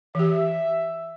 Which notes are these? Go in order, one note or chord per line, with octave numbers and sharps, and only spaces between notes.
E3 G4 E5